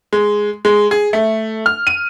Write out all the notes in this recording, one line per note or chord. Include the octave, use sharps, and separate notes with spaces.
G#3
G#3
G#4
A3
F6
D#7